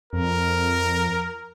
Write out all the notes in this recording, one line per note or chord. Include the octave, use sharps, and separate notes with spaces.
F2 A#4